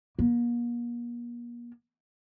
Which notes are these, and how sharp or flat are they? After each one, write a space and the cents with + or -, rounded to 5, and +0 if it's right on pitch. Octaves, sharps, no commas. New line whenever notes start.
A#3 +40